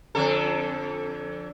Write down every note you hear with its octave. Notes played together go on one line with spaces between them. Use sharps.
F2 D3 A4